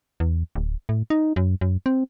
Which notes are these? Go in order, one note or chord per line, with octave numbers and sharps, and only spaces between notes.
E2
D1
A2
D#4
F#2
F#2
C4